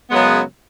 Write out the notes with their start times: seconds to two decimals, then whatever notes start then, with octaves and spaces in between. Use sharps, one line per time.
0.10 F#2 C#3 F#3 G#3 B3